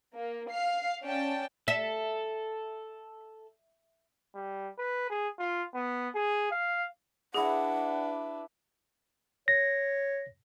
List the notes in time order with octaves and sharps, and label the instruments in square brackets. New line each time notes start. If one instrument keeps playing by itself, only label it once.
[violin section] A#3
F5 C7
C#4 D5 G5 A5
[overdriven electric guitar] A4 [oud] E5
[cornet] G3
B4
G#4
F4
B3
G#4
F5
[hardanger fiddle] D4 B4 [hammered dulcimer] E4 D5 [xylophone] G#4 [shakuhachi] F#5
[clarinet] C#5 [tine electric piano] A#6